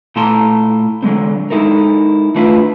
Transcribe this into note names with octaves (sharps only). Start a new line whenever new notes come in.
A#2 A3 E4 A5 A#5 C6
D3 F#3 G#3 C4
G#3 D#4 E4 A4 A#4
A3 D4 E4 F4 B4